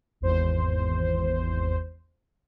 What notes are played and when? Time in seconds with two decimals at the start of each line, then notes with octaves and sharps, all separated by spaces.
0.21 G#1 E2 C5